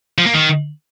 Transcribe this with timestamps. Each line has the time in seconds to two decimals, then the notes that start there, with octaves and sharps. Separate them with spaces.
0.18 F3
0.26 A#3
0.34 D#3